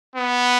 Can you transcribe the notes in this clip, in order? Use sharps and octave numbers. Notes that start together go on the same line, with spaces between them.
B3